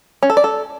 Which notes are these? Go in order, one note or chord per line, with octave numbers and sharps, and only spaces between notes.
C#4
A4
D5
A4